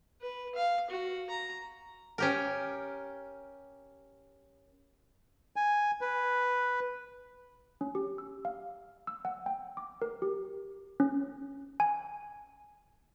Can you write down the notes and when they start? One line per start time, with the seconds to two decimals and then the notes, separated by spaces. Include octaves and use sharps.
0.21 B4
0.55 F5
0.90 F#4
1.30 A#5
2.18 C#4 G4 A#4
5.56 G#5
6.01 B4
7.81 C#4
7.95 G4
8.18 E6
8.45 F5
9.07 E6
9.25 F#5
9.46 G5
9.77 D6
10.02 A#4
10.22 G4
11.00 C#4
11.80 G#5